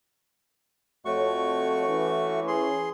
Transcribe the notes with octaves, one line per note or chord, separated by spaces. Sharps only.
F2 A3 F#4 C#5 C#6
E3 C#4
G#4 C6